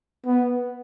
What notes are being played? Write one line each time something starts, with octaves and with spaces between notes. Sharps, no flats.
B3